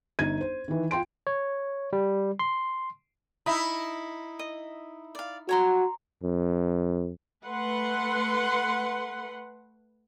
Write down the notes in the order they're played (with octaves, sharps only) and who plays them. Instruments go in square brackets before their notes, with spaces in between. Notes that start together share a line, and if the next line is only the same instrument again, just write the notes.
[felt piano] G1 D#4 G#6 D#7
C5
D#3 E3
F4 G5 C6 D7
[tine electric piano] C#5
G3
C6
[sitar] D#4 E4 [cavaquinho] B5
[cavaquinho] D#5
D5 F5
[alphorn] F#4 [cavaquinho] C#5 A#5 C6
[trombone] F2
[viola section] A3 B4 F#5 C6